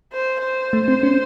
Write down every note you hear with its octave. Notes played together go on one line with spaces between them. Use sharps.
C5
C5
A3
C4
C#4